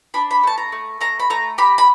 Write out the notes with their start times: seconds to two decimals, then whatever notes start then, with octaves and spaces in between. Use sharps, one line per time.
0.14 D4 B5
0.31 B5
0.43 A3 A5
0.58 A#5
0.72 A3
1.01 A3 A#5
1.20 B5
1.30 A3 A#5
1.58 G4 B5
1.78 B5